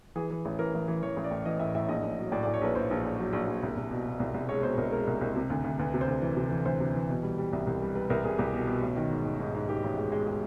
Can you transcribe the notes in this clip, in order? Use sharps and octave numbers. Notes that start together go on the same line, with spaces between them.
E3 G#4
E3
A1
E3 A#4
A1
E3
E3 C#5
A1
D5
A2
E3 D#5
A2 E5
A2 E5
A#1 D#5
A#1
F#3
A2 D5
D5
A2
C#5
A#1 B4
A#1 C5
A#1
A#1
F#3
A#1
A#1
C2
C2
B2
B2
C2
C2
G#3 C#5
B2 C5
C2 A#4
G#3 A#4
C2
C2
C3
D2
D2
D2 B4
C3
C5
D2
E3
C3
E3
D2 C5
C3
E3
B2
G3
G3
C2
C2
G3
G3 B4
C2 A#4
C2 G#4
C2 G4
B2
B2
A1
D#3
G#2
D#3
G#2
G#2
G#2 G4
A1
G#3
G#3
G#3